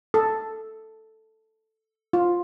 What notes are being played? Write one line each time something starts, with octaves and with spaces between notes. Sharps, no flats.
A4
F4